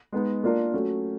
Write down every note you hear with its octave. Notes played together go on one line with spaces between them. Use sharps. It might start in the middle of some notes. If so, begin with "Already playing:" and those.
G#3 B3 D#4
A#3 D4 F4 A#4
F#3 A3 C#4